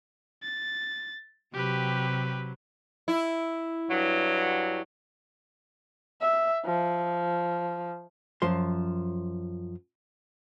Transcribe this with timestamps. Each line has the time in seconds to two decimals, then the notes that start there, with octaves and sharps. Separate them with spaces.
0.43 A6
1.54 C3 F#3 G4 B4
3.08 E4
3.90 G2 F#3
6.21 E5
6.65 F3
8.42 F#2 F3 C6